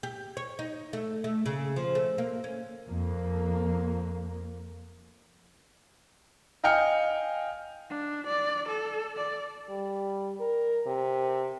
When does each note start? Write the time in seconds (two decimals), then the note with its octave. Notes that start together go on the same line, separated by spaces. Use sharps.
0.03 G4
0.37 C#5
0.59 D#4
0.93 A3
1.24 A3
1.46 C#3
1.76 F3
1.95 A3
2.18 A#3
2.44 C#4
2.87 F2 A#3
6.64 D#5 F5 G5 G#5 F6 C#7
7.90 D4
8.26 D5
8.68 A4
9.17 D5
9.69 G3
10.40 A#4
10.86 C3